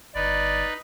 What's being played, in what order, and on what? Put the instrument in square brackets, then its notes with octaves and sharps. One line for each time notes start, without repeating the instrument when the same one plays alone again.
[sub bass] G1 [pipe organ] D#4 B4 [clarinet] D5